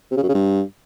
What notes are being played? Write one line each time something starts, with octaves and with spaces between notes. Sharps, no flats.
C3
C#3
F#2
C#3
G2